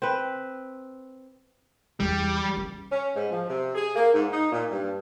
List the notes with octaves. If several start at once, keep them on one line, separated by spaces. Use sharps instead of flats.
C4 B4
E2 E3 G3
C#3
C#4
G#2
F3
C3
G#4
A#3
G#2
D#4
A#2
G2